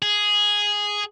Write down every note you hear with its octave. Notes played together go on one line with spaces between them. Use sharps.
G#4